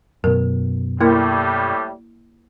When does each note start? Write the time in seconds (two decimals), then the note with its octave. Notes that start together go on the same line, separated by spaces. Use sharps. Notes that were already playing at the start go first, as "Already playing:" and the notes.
0.24 F#2 B2 A#4
1.01 A2 G3 A#3 E4 A#4